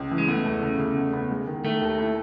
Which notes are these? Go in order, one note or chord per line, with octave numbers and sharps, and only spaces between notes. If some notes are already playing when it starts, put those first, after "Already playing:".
Already playing: C#2
E3
G#3
A3 B3
E2
C#3
C#3
E2
B3
G#3
D#3
D#3 A3
D#2
E4